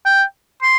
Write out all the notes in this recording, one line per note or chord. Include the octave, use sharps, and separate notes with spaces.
G5
C6